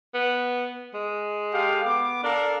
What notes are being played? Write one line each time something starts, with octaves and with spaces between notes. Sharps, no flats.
B3
G#3
G4 A4 F5
B3 D6
D4 A4 A#4 F5